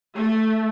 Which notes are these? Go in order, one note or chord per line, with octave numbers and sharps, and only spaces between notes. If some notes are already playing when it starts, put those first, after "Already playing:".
A3